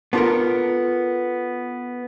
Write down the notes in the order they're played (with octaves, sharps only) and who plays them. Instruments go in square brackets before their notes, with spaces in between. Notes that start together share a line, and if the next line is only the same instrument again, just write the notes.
[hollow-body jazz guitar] B3 D4 F4 G4 A4 A#4